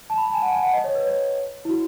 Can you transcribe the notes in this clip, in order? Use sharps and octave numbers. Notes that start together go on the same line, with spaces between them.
A5
B5
A5
G#5
F#5
G#5
F#5
D#5
C#5
B4
C#5
E4
F#4